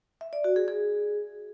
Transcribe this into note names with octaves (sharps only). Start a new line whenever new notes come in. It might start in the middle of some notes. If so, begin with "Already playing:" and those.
E5
D5
F#4
G#4
G#4